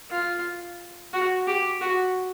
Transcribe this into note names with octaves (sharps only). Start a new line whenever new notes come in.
F4
F#4
G4
F#4